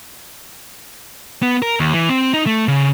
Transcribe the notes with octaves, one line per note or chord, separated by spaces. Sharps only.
B3
A#4
D#2
E3
C4
D#4
A3
C#3